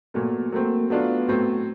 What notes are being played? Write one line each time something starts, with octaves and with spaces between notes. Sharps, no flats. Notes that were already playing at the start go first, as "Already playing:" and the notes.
A#2 F#3 A3 B3
F#3 A3 A#3 C4
F#3 A3 B3 D4 F4
A2 F#3 A3 C4